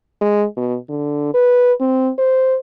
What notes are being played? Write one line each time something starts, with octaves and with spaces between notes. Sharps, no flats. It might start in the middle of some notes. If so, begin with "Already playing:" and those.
G#3
B2
D3
B4
C4
C5